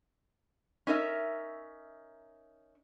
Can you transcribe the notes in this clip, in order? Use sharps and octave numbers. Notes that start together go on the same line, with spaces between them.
C#4 D#4 A#4 E5